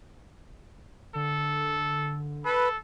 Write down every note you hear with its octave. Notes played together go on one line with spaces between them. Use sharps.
D3 A4
A4 B4